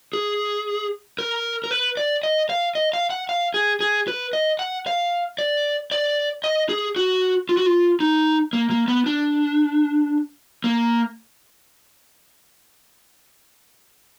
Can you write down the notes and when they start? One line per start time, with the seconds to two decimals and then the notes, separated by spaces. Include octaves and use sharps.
0.13 G#4
1.19 A#4
1.64 A#4
1.71 B4
1.97 D5
2.23 D#5
2.49 F5
2.75 D#5
2.93 F5
3.10 F#5
3.29 F5
3.54 G#4
3.80 G#4
4.08 B4
4.33 D#5
4.59 F#5
4.87 F5
5.39 D5
5.91 D5
6.44 D#5
6.69 G#4
6.96 F#4
7.49 F4
7.57 F#4
7.66 F4
8.00 D#4
8.53 A#3
8.70 A#3
8.88 B3
9.06 D4
10.64 A#3